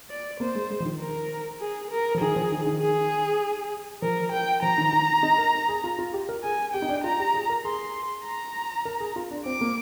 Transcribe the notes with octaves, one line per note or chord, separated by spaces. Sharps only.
D5
A#3 C5
G#3
G#3
F3
D#3
A#4
G#4
A#4
F3
D#3 G#4
F3
D#3
D#3
G#4
F3 A#4
G5
F3 A#5
D#3
D#3
D#4
A#4
G#4
F4
F4
G4
A#4
G#4 G#5
G4 G5
D#4
D4
F4 A#5
G4
G#4
A#4
G#4 C6
A#5
A#4
G#4
F4
D4
C4 D6
A#3